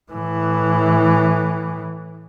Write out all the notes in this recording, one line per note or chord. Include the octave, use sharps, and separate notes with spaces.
A2 E3